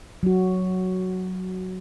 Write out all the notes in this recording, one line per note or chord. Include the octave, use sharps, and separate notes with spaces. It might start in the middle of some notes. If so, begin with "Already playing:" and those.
F#3 F#4